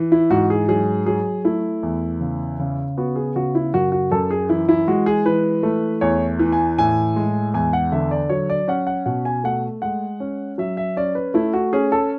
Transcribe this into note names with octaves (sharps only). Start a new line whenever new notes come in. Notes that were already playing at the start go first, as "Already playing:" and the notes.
Already playing: E3
E4
G#2 F#4
G#4
F#3 G#4
F#3 G#4
A3 E4
E2
C#3
C#3
B3 F#4
G#4
C#3 F#4
E4
F#2 F#4
F#4
F#2 A4
G#4
E3 E4
E4
G#3 F#4
G#4
E3 B4
A3
E2 C#5
E3
G#5
A2 G#5
G#3
E2 G#5
F#5
D3 E5
D5
F#3 C#5
D5
C#4 F#5
F#5
B2 F#5
G#5
A3 F#5
G#3 F#5
C#4
F#3 E5
E5
C#4 D5
B4
A3 E4
F#4
C#4 G#4
A4